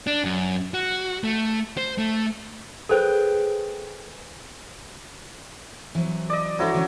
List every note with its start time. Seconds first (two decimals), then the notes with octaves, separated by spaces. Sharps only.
0.07 D4
0.24 F#2
0.74 F#4
1.24 A3
1.77 C5
1.98 A3
2.89 G#4 A4 B4 C5 G5
5.95 E3 F#3 C4
6.29 D5 D#5
6.59 F#3 D4 E4 A4 C5
6.74 D3 E3 C#4